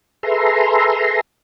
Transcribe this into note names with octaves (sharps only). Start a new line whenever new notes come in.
G#4 A4 B4 E5 A#5 C6